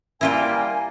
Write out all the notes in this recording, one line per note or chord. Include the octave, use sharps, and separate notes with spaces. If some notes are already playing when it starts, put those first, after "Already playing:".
G3 A#3 E4 F4 G5 G#5